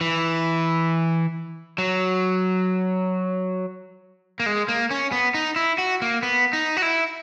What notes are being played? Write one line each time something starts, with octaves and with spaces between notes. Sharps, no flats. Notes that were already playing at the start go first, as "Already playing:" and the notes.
E3
F#3
A#3
G#3
A#3
C#4
B3
D#4
E4
F#4
A#3
B3
D#4
F#4
E4